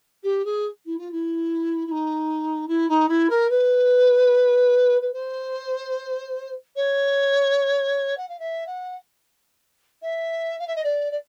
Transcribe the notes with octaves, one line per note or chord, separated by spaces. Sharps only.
G4
G#4
E4
F4
E4
E4
D#4
E4
D#4
E4
A#4
B4
B4
C5
C#5
F#5
F5
E5
F#5
E5
F5
E5
D#5
D5
D5